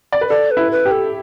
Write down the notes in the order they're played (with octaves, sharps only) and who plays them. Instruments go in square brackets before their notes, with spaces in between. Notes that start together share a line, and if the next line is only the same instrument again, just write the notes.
[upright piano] D5
B4
[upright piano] A4 [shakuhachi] D5
[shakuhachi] B4
[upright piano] E4
[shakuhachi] B4
[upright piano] G4
[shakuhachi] A4